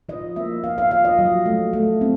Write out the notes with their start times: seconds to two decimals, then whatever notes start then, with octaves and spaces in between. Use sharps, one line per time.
0.09 F3 D#5
0.36 A#3 E5
0.64 F3 F5
0.78 F5
0.91 F3 F5
1.05 D#5
1.19 F#3
1.46 A3
1.73 A3
2.01 C4